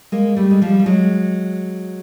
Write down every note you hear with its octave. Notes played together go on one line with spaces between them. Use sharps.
G#3 A#3
G3 A3
G#3
F3 G3
G3
F#3 G#3